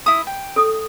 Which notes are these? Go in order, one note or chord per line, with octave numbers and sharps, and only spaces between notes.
E4 D#6
G5
A4 D#6